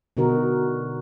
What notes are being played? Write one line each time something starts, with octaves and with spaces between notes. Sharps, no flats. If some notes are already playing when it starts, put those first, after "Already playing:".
B2 D3 D#4 F#4 A#4